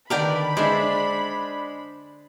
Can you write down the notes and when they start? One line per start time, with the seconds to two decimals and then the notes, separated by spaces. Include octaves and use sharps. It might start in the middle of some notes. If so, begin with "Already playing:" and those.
0.10 D3 D#3 A#4 B4 D5 G5 B5
0.57 G#3 D4 C5 D5 E5